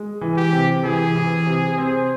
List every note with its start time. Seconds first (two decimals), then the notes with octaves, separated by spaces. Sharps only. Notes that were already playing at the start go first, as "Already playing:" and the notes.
Already playing: G#3
0.21 E3
0.37 G4
0.53 C3
0.83 E3 G#4
1.15 E3
1.47 C3
1.78 C4